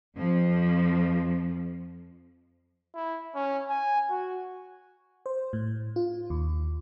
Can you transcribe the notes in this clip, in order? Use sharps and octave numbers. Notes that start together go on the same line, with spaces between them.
F2 F3
E4
C#4
G#5
F#4
C5
A2
F4
D#2